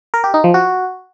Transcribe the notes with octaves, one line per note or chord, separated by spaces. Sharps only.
A#4
G4
D#4
F3
F#4